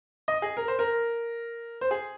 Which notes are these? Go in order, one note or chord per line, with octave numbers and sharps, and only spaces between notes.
D#5
G#4
A#4
C5
A#4
C5
G#4